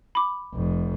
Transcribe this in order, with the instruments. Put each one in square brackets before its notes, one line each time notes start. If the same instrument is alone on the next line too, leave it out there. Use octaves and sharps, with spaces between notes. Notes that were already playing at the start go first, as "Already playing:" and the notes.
[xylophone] B5 D6
[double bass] F1 F2